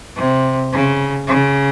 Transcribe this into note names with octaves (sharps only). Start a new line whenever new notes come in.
C3
C#3
C#3